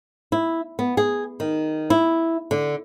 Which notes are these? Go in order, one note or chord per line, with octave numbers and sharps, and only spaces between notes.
E4
B3
G#4
D#3
E4
D3